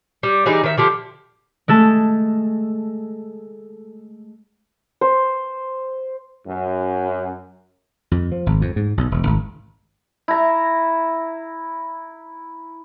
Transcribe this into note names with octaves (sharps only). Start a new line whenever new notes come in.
G3
E3 G3 D#4 G#4
D#3 E5
D3 F3 G4
G#3 A3 A4
C5
F#2
F2
F3
G#1
F2
G#2
B1
E1
G#1
E4 A#5